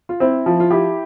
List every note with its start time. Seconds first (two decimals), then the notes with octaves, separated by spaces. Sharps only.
0.09 F4
0.20 C4 E4
0.46 F3
0.60 F4
0.71 E4 G4